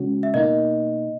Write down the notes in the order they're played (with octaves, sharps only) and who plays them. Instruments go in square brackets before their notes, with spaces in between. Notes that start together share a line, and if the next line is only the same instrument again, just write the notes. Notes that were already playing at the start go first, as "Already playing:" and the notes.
Already playing: [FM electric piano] C#3 G#3 C#4 F#4
[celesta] E5
[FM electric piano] B2 A#3 D#4 [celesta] D#5